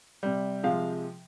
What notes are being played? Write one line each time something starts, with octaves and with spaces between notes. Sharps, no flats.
C3 G3
C3 F3 G#3 F5